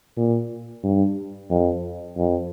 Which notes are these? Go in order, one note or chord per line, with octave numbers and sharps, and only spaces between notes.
A#2
G2
F2
F2